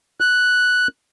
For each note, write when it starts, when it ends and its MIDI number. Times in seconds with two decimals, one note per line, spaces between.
0.21 0.88 90